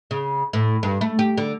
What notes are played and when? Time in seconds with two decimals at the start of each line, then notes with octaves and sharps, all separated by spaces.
0.11 C#3
0.53 A2
0.83 G2
1.01 A3
1.19 G4
1.37 D3